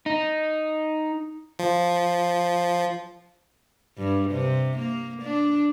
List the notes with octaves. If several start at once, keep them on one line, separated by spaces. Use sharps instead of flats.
D#4
F3
G2
C3
A#3
D4